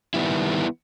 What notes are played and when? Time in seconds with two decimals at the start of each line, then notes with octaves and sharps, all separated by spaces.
0.14 D#3 G3 B3 E4